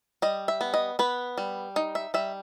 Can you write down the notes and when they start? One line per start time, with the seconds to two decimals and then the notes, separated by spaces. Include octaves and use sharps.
0.22 G3 D#5
0.48 E5
0.61 B3
0.74 D#5
0.99 B3 B4
1.38 G3
1.76 D#4
1.95 E5
2.14 G3 E5